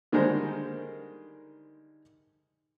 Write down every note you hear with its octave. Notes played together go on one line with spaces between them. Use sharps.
D3 D#3 G3 G#3 A#4 C5